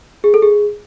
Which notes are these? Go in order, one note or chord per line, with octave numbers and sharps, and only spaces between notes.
G#4
A4
G#4